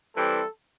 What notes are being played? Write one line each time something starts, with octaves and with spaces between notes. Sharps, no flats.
E3 G3 C4 A4